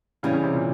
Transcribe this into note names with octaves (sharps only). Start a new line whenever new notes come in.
C#3 E3 G3 C#4
C#3
C3
A#2